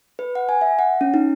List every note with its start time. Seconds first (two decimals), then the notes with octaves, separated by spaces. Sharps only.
0.19 B4
0.35 F#5
0.49 G#5
0.61 E5
0.79 F#5
1.01 C#4
1.14 D#4